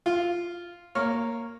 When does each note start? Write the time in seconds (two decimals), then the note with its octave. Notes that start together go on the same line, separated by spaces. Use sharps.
0.06 F4
0.95 A#3 C#5 F6